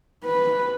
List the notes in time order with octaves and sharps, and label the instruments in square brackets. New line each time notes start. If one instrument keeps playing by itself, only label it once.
[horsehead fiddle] B4